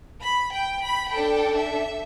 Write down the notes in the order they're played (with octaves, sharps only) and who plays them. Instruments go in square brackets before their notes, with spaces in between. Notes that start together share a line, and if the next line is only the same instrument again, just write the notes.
[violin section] B5
G5
B5
D4 A4 G5
E5